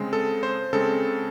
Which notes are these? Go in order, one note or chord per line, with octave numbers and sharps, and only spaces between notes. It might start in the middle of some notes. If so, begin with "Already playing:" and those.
Already playing: C#3 G#3 C4
A4
C5
C#3 G#3 C4 A4